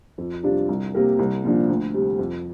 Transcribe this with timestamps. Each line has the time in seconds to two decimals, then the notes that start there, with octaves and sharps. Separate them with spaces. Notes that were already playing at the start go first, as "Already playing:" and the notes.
0.18 F2
0.43 C3 G3 D4 F4
0.69 C2
0.94 C3 A#3 G4 A#4
1.19 C2
1.44 A#2 F3 D4
1.69 D2
1.94 C3 G3
2.19 F2